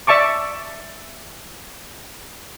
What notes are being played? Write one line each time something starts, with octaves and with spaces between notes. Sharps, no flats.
D5 E5 A5 C#6 D6